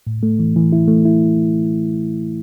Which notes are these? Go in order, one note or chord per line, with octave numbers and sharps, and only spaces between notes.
A2
A3
E3
E3
E4
A3
E4